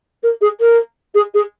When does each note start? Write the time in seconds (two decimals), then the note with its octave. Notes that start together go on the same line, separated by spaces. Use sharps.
0.23 A#4
0.41 G#4
0.60 A#4
1.14 G#4
1.34 G#4